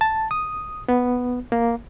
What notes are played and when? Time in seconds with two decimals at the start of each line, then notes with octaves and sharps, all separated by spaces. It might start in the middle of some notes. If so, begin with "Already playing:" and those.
0.01 A5
0.31 D#6
0.89 B3
1.52 A#3